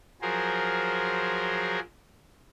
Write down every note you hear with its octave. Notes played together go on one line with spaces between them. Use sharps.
F3 F#3 G#4 A#4 C5